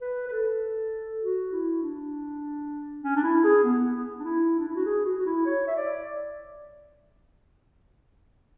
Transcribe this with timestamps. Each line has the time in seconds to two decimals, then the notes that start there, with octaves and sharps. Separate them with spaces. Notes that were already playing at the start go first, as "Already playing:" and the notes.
0.01 B4
0.28 B4
0.32 A4
1.22 F#4
1.52 E4
1.83 D4
3.04 C#4
3.16 D4
3.23 E4
3.44 G#4
3.64 B3
4.20 D4
4.24 E4
4.59 D4
4.68 E4
4.76 F#4
4.85 G#4
5.05 F#4
5.18 F#4
5.26 E4
5.46 C#5
5.67 E5
5.76 D5